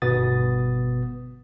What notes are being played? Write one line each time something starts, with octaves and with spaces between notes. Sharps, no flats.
G1 B2 B3 D#6 A6